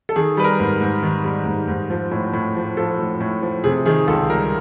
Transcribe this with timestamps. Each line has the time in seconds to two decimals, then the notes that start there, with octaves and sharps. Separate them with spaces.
0.09 A4
0.16 D#3 G#4
0.37 G3 B4
0.44 A#4
0.60 G#2
0.81 G#2
1.03 D#3
1.25 G3
1.46 G#2
1.68 G#2
1.90 F3
2.11 A2
2.33 A2
2.56 F3
2.77 F3 A4
2.99 A2
3.20 A2
3.42 F3
3.64 C3 G#4
3.86 D#3 G#4
4.07 C#2 A4
4.30 G3 A#4